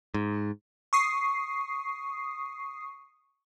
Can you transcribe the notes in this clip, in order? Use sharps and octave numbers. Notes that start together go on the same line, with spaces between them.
G#2
C#6 D#6 C7